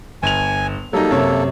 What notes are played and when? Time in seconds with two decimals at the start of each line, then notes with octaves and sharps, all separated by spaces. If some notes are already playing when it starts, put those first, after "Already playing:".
0.23 G1 G#5 F7
0.93 F#3 G3 A#3 D#4 A4
1.10 F#2 C3 C#5